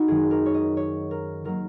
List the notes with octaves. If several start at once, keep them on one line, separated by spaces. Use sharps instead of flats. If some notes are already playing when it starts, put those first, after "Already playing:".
Already playing: D#4 F#4
F#2 D#3 G#3 G#4
A#4
C#5
D#5
C#5
A#4
D#3 F#3 A#3 A#4